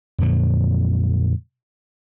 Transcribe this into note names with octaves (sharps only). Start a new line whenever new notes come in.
F2 A#2 D3 F#3